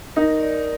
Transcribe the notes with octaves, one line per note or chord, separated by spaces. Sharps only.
D#4 A#4
D5